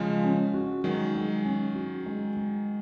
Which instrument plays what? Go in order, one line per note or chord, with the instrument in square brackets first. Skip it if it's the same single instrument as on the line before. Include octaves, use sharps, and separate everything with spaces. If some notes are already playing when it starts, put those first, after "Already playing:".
Already playing: [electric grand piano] C#3 F3 [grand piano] G#3
[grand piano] C#4
F#4
[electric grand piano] D#3 F#3 [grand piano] G#3
[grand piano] G#3
C#4
F#4
G#3
G#3